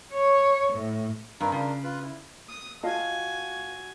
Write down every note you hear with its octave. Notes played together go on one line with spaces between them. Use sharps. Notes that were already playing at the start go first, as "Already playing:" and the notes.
C#5
A2
G2 C4 D#4 A#4
C#3 D4 F4 A#4
F4 B4
E4
D#6
F4 F#4 D#5 G#5 A5